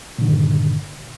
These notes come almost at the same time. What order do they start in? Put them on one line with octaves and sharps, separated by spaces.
A#2 D3 D#3 G2